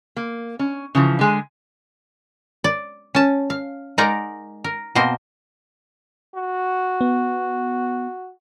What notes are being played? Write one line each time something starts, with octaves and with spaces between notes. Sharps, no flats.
A#3
C#4
C#3 E3 F3
D3 G#3 G#5
D5
C#4 A5
F5
G#3 D#4 A#4 D5 F#5 A#5
A#4
B2 A#3 C4 C5 D#5
F#4
B3